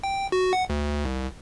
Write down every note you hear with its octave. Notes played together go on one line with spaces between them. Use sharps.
G5
F#4
F#5
D2
C2